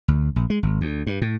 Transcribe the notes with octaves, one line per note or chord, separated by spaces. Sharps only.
D2
A#1
G#3
G#1
D2
G2
A2